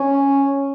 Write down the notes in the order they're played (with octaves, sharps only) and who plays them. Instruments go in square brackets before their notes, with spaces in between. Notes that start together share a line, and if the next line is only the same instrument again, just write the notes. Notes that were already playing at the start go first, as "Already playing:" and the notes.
Already playing: [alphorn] C#4